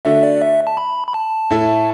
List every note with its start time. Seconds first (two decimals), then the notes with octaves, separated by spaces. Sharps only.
0.05 D3 A3 D4 F#4 A4 E5
0.23 D5
0.41 E5
0.67 A5
0.77 B5
1.08 B5
1.14 A5
1.50 A2 A3 E4 A4